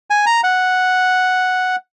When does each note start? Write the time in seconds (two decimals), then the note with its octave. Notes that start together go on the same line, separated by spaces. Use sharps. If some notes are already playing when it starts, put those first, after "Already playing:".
0.10 G#5
0.26 A#5
0.44 F#5